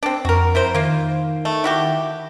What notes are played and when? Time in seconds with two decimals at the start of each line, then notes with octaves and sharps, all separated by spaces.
0.03 C4 D4
0.25 F2 F#4 A#4
0.55 E4 A#4 C5
0.75 D#3 A#3 F4
1.45 A3
1.64 E4 F#4 G4